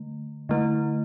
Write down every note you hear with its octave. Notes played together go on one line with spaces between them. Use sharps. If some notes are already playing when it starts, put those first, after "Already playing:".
Already playing: D3 A3
D3 A3 E4